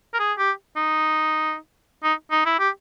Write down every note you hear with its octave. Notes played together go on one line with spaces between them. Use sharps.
A#4
G#4
G4
D#4
D#4
D#4
E4
G4